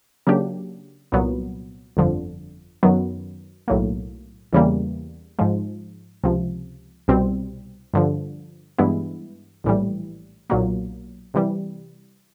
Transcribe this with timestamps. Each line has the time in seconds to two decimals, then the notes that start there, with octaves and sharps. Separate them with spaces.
0.27 C#3 F#3 A#3 D4 G4
1.12 C2 A#2 F#3 B3
1.97 G1 F2 D3 F3
2.83 F#2 D#3 F#3 B3
3.68 B1 A2 F#3 A#3
4.53 E2 C#3 E3 G3 A#3
5.39 G#2 F3 G#3
6.24 C#2 C3 F3
7.08 C2 B2 G3 C4
7.94 G2 D3 F3
8.78 G2 E3 G#3 B3 E4
9.64 A#1 A2 E3 G3
10.50 B1 A#2 F#3 A#3
11.34 C3 E3 G3